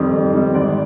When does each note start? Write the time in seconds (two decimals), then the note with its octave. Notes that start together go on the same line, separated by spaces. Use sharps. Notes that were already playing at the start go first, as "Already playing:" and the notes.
Already playing: F2 D#3 G3 C4
0.12 F2
0.33 D#3 G3 C4
0.54 G#1 D5